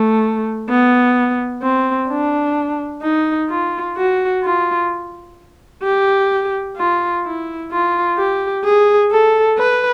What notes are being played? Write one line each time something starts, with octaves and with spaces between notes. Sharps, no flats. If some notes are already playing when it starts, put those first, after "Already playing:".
Already playing: A3
B3
C4
D4
D#4
F4
F#4
F4
G4
F4
E4
F4
G4
G#4
A4
B4